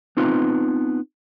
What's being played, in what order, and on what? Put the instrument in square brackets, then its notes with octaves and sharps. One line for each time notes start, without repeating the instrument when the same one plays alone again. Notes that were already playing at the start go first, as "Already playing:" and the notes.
[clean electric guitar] B3 C4 D#4 F4 B4